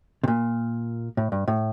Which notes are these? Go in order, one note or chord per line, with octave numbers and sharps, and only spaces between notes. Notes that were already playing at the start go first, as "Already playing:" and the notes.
C3
A#2
A2
G2
A2